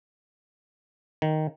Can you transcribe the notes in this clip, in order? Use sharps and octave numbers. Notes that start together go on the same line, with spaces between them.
D#3